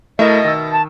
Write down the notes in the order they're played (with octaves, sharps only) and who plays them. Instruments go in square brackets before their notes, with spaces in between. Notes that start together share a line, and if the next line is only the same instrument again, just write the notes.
[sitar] B2 E5 [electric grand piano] A3 E4 A#4 [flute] D#5
[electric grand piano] D#3 E6
[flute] A5